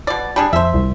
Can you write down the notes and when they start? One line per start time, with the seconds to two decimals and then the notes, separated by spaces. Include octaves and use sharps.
0.07 B2 D5
0.36 G3 D4 G#4
0.53 F2 C5 E5
0.74 C2